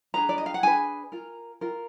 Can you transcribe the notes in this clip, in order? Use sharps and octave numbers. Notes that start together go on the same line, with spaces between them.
D4 G#4 B4 A#5
D5
D#5
F5
F#5
D4 G#4 B4 G#5
F4 A#4
F4 A#4